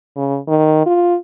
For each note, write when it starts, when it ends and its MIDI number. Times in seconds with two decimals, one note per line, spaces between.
0.17 0.39 49
0.48 0.86 51
0.86 1.16 65